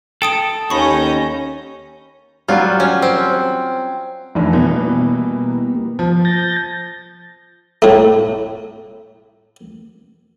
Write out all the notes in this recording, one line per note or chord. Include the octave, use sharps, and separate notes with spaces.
A4 G5 D#6 D7
D#2 C#4 B5 C#6 G6 A#6
F#3 G3 F4
C#4
C4
F1 E3 D4
B2 E3 G3 A#3 B3
F3
G6 A6 A#6
A2 A3